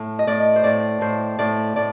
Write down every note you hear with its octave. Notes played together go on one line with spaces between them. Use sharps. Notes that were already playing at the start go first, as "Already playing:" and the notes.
Already playing: A2
D#5
A2 D5
C5
A2 D5
A2 C5
A2 D5
A2 D5